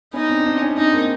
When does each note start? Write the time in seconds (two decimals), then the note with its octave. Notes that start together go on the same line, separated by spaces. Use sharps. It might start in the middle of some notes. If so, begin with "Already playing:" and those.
0.13 B3 C#4 D#4
0.29 C4 D4
0.46 C4 D4
0.61 C#4 D#4
0.77 C4 D4 D#4
0.94 A#3 C4